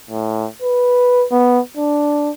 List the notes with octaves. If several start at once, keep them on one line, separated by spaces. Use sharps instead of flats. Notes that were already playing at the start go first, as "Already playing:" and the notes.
A2
B4
B3
D4